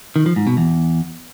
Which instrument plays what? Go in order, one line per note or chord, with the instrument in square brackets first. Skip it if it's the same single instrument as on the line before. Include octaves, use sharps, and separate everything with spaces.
[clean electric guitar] D#3
F3
G#2
B2
E2